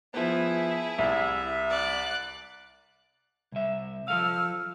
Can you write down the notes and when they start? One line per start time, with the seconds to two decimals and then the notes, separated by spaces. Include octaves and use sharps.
0.14 F3 B3 E4 G#4
0.98 C2 E5
1.70 D5 F#6
3.52 C2 E5
4.08 F3 A4 F5 E6 F6